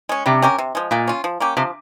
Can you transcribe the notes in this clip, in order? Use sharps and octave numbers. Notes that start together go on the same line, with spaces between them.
G#3 C#4
C3 G3
C#4 G4 A#4
C3
F3 G#3
A#2 G#3
C#4 F4
F3
A#3 C#4 G4
C3 F3